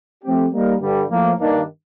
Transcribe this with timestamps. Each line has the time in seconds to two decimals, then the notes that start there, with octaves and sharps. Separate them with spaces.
0.24 F3 A3 C4 G4
0.52 G3 A#3 D#4 A#4
0.82 G2 D3 G3
1.10 A2 F3 A#3
1.39 G2 D#3 A#3 D4